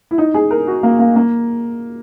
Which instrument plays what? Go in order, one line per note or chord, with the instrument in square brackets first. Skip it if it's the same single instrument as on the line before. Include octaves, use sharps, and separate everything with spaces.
[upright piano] E4
D#4
G#4
A#4
F#4
A#3
A#3
A#3